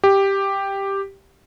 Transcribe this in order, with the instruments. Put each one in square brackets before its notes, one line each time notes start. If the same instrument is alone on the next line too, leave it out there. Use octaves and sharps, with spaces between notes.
[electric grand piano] G4